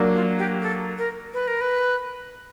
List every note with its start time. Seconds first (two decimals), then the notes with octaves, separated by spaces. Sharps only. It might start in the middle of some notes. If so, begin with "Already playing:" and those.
Already playing: F#3 A#3 D4
0.14 F4
0.39 G4
0.62 A4
0.98 A#4
1.34 B4
1.48 A#4
1.61 B4